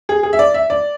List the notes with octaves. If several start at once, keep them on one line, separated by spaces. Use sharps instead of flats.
G#4
G#4
E5
D5
E5
D5